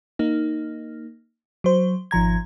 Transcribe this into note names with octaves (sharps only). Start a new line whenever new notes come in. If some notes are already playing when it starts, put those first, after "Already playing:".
A#3 D#4
F#3 C5
G#1 F3 A#5 G#6